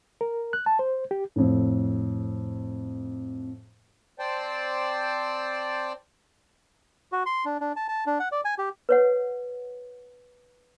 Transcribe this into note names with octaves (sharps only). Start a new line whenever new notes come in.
A#4
F#6
A5
C5
G4
F2 A2
C4 C5 D5 G5 A5
F#4
C6
D4
D4
A5
A5
D4
F#5
D5
G#5
G4
B4 C#5 F#5